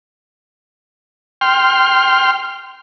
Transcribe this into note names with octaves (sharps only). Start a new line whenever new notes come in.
G5 C6 F6